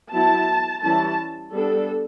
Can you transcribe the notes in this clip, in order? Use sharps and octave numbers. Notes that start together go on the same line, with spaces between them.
F#3 B3 E4 A5
E3 G3 C#4 E4 A5
G3 B3 D4 A4